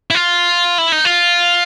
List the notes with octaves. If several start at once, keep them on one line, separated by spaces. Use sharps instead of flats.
E4
F4
E4
D#4
F4